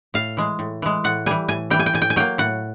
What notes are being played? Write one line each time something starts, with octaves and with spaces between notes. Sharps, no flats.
A2 F5
E3 G#3
A2
E3 G#3
A2 F#5
E3 G3 G#5
A2 G#5
E3 G3 G5
G#5
G5
A2 G#5
G5
G#5
F#3 A#3 G5
A2 F#5